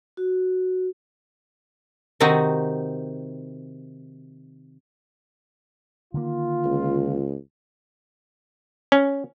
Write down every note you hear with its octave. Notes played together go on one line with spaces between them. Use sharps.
F#4
C3 D#3 C4 D#4 F#4
D3 D#3 A#3 F4
C#2
C#4